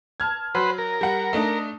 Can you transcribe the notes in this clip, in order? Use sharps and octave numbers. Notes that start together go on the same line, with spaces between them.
A5 F6 G#6
F#3 B4 C5 F#5
A#4
G3 F#5
A3 D4 D#4